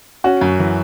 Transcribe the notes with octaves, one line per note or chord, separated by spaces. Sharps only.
C#4 F#4
F#2
E3